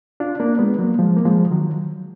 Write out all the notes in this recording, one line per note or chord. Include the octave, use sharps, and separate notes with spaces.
D4 F4
A#3 D4
G#3 B3
F#3 A#3
F3 G#3
A#3
F3 G#3
D#3 F#3